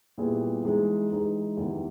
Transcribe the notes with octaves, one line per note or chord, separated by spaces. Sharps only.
A#2 G3 B3 E4 G#4
E3 G#3 D#4 G#4
E3 G#3 D#4 G#4
E2 D#3 G3